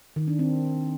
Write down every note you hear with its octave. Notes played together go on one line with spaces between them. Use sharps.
D#3
D4
C4